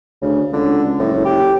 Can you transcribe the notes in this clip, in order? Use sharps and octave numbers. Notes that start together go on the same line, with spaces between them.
D2 C#3
C#2 D3
F#1 A2
G4